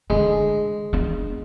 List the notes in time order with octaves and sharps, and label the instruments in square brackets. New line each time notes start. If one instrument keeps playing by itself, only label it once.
[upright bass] D3 [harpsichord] G#3
[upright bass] B3 D4